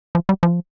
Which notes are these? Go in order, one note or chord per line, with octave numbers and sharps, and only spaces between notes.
F3
G3
F3